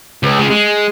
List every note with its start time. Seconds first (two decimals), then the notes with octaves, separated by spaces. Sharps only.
0.23 C#2
0.39 C#3 G#3
0.51 G#3